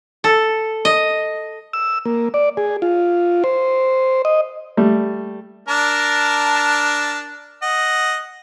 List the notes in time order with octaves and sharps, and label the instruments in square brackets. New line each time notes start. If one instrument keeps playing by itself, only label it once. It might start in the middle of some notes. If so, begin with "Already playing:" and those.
[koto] A4
D#5
[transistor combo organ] E6
A#3
D5
G#4
F4
C5
D#5
[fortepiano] G3 A3
[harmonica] D4 A#4 A5
D#5 F#5